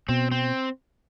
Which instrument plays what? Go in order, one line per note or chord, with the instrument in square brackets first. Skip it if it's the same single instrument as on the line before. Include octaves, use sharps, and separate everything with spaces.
[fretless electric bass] B2 [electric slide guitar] C4
[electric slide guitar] C4